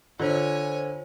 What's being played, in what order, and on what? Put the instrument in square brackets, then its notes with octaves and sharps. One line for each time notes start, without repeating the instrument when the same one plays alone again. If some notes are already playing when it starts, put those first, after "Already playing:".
[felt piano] D3 [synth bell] F4 C5 [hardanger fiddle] C#5 G#5